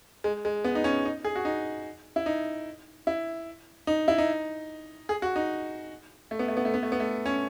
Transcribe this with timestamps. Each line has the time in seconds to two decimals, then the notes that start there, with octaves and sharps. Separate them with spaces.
0.24 G#3
0.45 G#3
0.64 B3
0.75 D#4
0.84 C#4
1.05 D#4
1.24 G#4
1.35 F#4
1.45 D#4
2.16 E4
2.26 D#4
3.07 E4
3.87 D#4
4.08 E4
4.18 D#4
5.09 G#4
5.22 F#4
5.36 D#4
6.31 A3
6.39 B3
6.48 A3
6.57 B3
6.65 A3
6.74 B3
6.83 A3
6.92 B3
7.00 A3
7.26 C#4